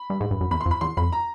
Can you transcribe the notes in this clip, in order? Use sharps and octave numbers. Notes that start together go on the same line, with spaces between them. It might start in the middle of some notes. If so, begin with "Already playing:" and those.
Already playing: B5
G2
G#2
G2
F#2
E2 B5
C6
F2
B5
E2 C6
F2 B5
A#5